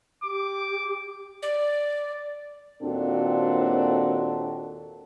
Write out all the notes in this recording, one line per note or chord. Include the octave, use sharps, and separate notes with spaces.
G4 D6
D5
D#2 A#2 C4 D4 F#4 A4